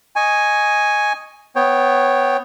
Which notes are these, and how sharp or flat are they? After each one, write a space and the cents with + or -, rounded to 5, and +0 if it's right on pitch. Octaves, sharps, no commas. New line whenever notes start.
D#5 +0 G#5 +0 C#6 +0
B3 +15 C#5 -10 G5 +0